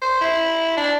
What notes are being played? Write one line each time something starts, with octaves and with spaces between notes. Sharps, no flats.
C5
E4
D4